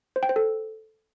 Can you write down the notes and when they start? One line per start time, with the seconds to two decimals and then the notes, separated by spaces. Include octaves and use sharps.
0.16 C5
0.23 G5
0.29 C5
0.36 A4